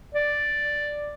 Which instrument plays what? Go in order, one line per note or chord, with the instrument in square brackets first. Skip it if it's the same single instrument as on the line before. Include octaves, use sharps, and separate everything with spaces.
[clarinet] D5